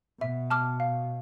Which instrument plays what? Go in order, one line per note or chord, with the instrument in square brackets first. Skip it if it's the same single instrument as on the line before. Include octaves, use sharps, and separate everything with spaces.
[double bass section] B2 [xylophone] E5
[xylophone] A5 D6 F6
F5